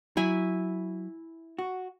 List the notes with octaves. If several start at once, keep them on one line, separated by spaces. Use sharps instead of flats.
F#3 E4 G#5 B5
F#4